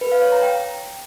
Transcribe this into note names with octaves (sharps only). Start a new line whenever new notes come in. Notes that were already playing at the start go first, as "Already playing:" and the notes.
B4
F5
C#5
A#5
G5